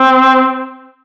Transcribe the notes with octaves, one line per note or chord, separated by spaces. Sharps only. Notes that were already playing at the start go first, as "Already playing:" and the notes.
Already playing: C4